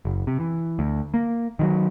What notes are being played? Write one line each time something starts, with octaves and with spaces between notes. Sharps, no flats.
F#1
C3
E3
D2
A#3
D#3 E3 F#3